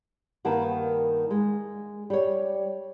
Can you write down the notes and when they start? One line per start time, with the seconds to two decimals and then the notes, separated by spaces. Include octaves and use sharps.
0.45 G2 D#3 A#3 B3 A5
1.30 G#3
2.10 G3 C#5